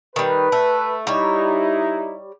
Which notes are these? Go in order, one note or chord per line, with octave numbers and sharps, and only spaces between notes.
D#3 G3 B4
A3
G3 D#4 E4 C#5